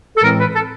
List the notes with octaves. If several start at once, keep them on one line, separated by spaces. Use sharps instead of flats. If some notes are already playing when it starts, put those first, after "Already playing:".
A4
A2 E3 G#3 C4 A#4
B4
A4